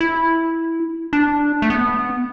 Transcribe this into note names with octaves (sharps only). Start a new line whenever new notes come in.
E4
D4
A3
B3